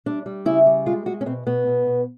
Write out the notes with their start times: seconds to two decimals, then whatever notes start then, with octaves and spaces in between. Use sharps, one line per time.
0.06 G3 D4
0.26 G3
0.45 C#3 E4
0.66 G3
0.86 G#3 F4
1.06 G#3 F#4
1.21 C#4
1.26 B2 C4
1.46 B2 B3
1.67 B2
1.86 B2